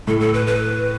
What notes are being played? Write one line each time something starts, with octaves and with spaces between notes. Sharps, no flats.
A2 A4
A4
B4
B4